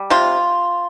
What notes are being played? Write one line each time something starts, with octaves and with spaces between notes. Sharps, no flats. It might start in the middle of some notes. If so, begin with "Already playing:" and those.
Already playing: G3
C3 F4